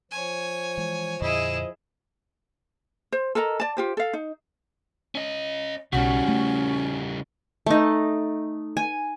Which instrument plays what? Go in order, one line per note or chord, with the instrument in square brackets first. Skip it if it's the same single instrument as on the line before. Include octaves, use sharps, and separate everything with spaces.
[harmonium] F3 [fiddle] C#5 G#5
[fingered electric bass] E3 G#3
[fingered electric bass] F2 A#2 D3 [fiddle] E4 G#4 [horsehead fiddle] D#5
[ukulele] C5
A4 A#4 D#5 A#5
D5 A5
F4 G4 C5
A4 F5
D#4
[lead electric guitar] C#4 D#5
[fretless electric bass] B1 [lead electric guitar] C#3 G3 [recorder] C#4 [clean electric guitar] F#4
[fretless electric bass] A3
[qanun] A3 D#4
G#5